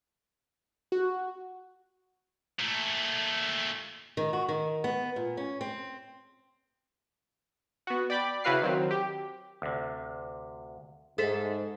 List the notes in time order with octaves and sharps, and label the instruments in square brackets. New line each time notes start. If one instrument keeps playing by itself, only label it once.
[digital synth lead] F#4
[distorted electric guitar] A#2 A3
[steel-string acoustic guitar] D#3
F#4
D#3
B3
A#2
C#4
C4
[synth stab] B3 F#4
D5 G5 B5 D6
C#3 E4 F#4 B4 F5 C7
D#3 F#3 C4
G4
[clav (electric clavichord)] D2 C3
[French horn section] G#2 [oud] G#4 A4 C5 [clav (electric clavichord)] E5